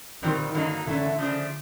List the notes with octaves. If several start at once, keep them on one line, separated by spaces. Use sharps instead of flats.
D3 D#3 G3 C4 F4
G2 D3 F#3 A#3 D#4
D3 E3 A3 C#4 E4
C#3 F3 A3 D4